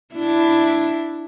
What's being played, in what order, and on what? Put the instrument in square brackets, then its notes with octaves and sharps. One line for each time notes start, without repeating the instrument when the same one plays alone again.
[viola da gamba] D4 E4